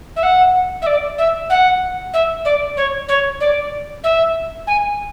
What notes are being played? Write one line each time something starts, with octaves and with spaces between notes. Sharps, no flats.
E5
F#5
E5
D5
E5
F#5
E5
D5
C#5
C#5
D5
E5
G#5